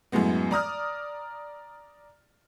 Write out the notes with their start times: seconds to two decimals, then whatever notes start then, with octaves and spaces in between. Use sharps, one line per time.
0.12 F#2 A2 F#3 G#3 B3
0.51 D5 A#5 D#6 F6